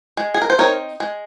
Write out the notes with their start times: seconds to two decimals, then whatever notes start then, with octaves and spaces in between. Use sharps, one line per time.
0.17 G#3
0.34 G#4
0.42 A#4
0.50 C5
0.58 C4 D#4 A#4 C#5
1.00 G#3